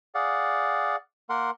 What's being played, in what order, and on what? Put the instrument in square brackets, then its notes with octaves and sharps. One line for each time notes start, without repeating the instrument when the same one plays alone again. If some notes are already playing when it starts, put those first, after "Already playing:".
[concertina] G#4 D5 F5 F#5
A#3 A#4 F#5 C6